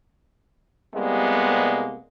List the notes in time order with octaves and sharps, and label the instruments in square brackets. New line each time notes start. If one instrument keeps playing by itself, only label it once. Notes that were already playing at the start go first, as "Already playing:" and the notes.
[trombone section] C2 C3 G3 G#3 A#3 B3